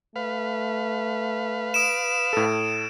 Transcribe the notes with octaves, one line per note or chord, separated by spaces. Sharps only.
A3 B4 F5
D#6 D7 E7
A2 A4